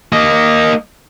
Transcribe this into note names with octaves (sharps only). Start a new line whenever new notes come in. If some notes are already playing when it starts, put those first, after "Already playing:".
A#3 D#5